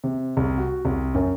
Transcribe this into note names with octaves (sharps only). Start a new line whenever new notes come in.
C3
C2
F#4
C2
F#2